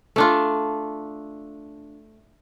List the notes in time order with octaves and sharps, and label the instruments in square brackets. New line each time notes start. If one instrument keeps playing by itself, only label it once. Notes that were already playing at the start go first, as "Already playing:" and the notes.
[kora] A3 D4 F4